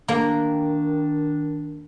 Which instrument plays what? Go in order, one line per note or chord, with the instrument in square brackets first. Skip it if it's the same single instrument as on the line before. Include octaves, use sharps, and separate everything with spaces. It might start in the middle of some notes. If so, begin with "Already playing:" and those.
[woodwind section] D#3 D4 [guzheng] A#3